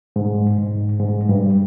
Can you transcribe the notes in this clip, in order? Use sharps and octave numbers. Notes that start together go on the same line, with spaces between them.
G#2
G#2
G#2
G2